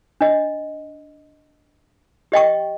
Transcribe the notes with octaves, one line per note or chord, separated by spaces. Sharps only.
D4 D#5
G4 D#5 G5 C#6